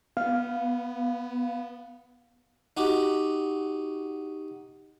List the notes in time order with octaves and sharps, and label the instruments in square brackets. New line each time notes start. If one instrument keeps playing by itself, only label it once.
[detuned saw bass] B3 [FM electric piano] F5
[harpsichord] D#4 F#4 G4